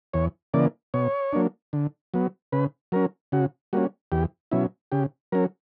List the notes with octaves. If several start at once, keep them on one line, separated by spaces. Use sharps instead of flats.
E2 C#5
C#3 E3 A#3 D5
B2 C#5
F#3 A#3 D4
D3
F#3 B3
C#3 B4
F#3 C#4 A#4
C#3 F#4
G3 A#3 C#4 F#4
E2 G4
B2 F#3 C#4 E4
C#3 G4
F#3 C#4 A#4